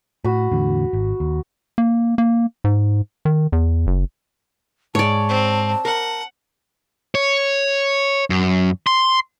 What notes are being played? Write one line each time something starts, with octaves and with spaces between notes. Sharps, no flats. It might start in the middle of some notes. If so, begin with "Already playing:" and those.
A2 F#4 B5
E2 A2 D3
G#1
D#2
A#3
A#3
G#2
D#3
E2
F#1
G#2 C#5 D5 A5
C4
A#4 F#5
C#5
F#2
C6